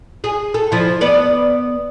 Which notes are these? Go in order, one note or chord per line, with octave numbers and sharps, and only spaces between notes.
G#4
A4
F3 E4
B3 D5